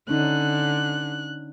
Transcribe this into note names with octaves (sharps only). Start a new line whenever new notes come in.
D3 C#4 D#4 F#6